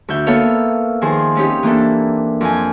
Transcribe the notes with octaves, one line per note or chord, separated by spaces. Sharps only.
D2 E5 G6
A#3 B3 A4 C#5 E5 F5
D#3 F3 G#4 C5
C4 C#4 D#4 G4
E3 A#3 D4 A4
F2 G#5